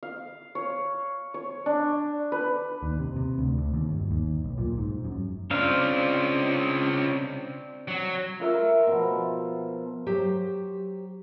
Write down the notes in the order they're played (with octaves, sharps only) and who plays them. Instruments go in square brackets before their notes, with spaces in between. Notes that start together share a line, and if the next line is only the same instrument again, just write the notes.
[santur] F5
C#5
C#5
D4
B4
[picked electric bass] D#2
C3
C3
D2
D2
D#2
G1
D#2
B1
A#2
G#2
F#2
[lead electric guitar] C#3 F4 [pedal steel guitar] C4 D4 F5
[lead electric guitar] F#3
[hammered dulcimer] F4 A#4 E5 F5
B2 F3
[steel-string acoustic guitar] F#3 G4 C5 A#5